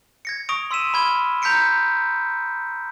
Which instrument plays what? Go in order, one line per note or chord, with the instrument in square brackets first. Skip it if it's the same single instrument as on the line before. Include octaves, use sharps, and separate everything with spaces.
[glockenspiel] G#6 A#6 C#7
C#6 D#6 A#6 D7 F7
C6 E6 B6 D#7 E7
B5 F6 G#6 G7
A#5 G6 G#6 B6 C#7 D7